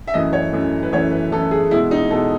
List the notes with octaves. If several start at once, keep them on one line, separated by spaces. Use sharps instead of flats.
E5
F#2 E3 A3 D#5
C#5
F#2 E3 A3
B4
F#2 E3 A3 C#5
B4
F#2 E3 A3 A4
G#4
B2 G#3 E4
D#4
B2 G#3 A4